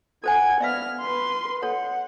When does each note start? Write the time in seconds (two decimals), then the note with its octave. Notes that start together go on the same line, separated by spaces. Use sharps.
0.24 A4 C5 F#5 G#5 G#6
0.60 B3 D5 E5 F5 F6
1.01 B4 C6
1.63 A4 C#5 F#5